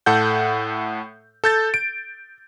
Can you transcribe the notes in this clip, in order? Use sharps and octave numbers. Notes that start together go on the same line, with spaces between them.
A2 A4 F#5 G6
A4 G6 A6
D7